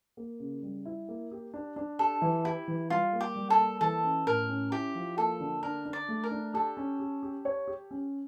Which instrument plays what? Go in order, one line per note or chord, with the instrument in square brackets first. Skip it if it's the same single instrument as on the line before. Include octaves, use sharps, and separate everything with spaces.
[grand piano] A#3
C#3
G3
E4
A#3
G4
D4
D4
[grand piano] G4 [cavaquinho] A4
[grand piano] E3
[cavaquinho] E4 [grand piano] G4
[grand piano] E3
[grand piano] G3 [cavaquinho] F4
[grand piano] A#3
[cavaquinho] G4
[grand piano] G3
[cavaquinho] A4
[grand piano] A#3
[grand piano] E3 [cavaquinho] A4
[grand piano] C#4
[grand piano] A2 [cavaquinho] A#4
[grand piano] C#4
[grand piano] E4 [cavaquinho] G4
[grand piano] F3
[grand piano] A#3 [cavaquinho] A4
[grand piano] D3
[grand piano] D4 [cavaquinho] A#4
[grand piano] D4
[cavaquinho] D5
[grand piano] A3
[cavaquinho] A#4
[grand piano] D4
[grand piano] G4 [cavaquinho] A4
[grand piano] C#4
G4
G4
C#5
G4
C#4